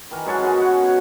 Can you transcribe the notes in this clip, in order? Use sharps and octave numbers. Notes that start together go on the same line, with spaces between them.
D#3 E3 A#4
F#2 G#3 C#5 A5
B3 C#4 F#4 G#4
F#4 C#5 F#5
B2